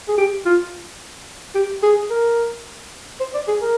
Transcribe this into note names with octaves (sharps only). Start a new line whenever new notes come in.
G#4
G4
F4
G4
G#4
A#4
C5
D5
G#4
A#4